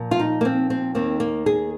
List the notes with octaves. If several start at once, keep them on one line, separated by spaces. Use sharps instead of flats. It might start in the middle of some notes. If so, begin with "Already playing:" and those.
Already playing: A#2 F3 A#3
F4
D#4
A#3
C4
C4
D#2 D#3 A#3 C4
A#3
G#4